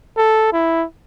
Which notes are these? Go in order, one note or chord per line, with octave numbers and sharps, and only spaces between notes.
A4
E4